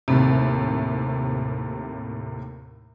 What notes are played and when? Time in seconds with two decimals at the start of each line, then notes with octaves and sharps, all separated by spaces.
0.08 D#2 A2 C3